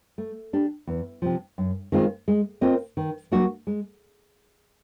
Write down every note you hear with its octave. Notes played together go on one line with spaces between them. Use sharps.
A3
D4 G4
E2
C3 F3
F#2
D#3 G#3 C4 F4
G#3
C4 F4 A#4 D#5
D#3
F#3 A#3 D4 F#4
G#3